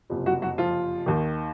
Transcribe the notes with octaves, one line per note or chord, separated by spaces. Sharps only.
F#1 F2 C3
F#3 F#4
F#3 F#4
F3 F4
D#2 D#3